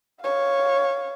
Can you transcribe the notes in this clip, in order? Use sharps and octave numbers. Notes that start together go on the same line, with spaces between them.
C#5 F5